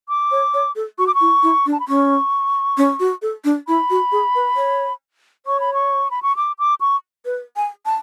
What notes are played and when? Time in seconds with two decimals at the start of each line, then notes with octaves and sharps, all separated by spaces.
0.09 D6
0.31 C#5
0.54 C#5
0.76 A4
0.98 F#4 C#6
1.07 D6
1.15 C#6
1.21 E4
1.43 E4
1.66 D4
1.72 A5
1.80 B5
1.88 C#4 C#6
2.77 C#4
3.00 F#4
3.22 A4
3.44 D4
3.68 E4 B5
3.90 F#4
4.12 G#4
4.35 B4
4.56 C#5
5.46 C#5 C#6
5.60 B5
5.74 C#6
6.11 B5
6.23 C#6
6.37 D6
6.59 D6
6.81 C#6
7.25 B4
7.56 G#5
7.86 A5